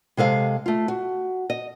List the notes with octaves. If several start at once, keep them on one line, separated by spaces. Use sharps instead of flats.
C3 G#3 A4 F5
A3 F4
F#4
D#5